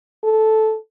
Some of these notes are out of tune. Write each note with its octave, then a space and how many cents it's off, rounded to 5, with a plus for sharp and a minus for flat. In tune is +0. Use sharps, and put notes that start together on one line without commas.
A4 -10